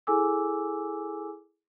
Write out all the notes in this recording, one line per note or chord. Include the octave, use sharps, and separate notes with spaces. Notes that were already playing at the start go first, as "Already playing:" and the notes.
E4 G#4 A4 G#5 D6 E6